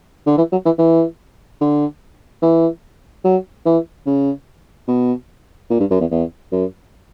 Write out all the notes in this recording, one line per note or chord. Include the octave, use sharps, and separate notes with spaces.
D3
E3
F#3
E3
E3
D3
E3
F#3
E3
C#3
B2
A#2
G2
F#2
E2
E2
F#2